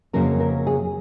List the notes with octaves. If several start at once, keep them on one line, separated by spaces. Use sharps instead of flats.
F2 C#3 F#3 A#3 C#4 A#4
A#4
G#4